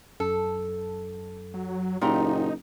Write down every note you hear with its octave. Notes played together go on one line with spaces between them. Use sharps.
F#2 A4
F#3
F#1 A#2 D#4 G4 A#5